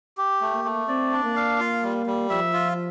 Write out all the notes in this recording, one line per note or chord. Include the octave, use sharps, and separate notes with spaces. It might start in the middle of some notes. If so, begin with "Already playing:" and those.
G4
A3
A#3
A3
C4 D5
D4
A#3
F5
F4
G3
G3
F3 E5
F4